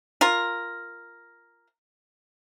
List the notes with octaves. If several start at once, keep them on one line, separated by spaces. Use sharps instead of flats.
F4 A#4